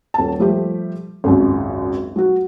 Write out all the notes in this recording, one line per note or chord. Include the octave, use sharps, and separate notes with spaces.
D#1 A5
F3 G3 A3 G4
G#1 C#2 F#2
F#3 F#4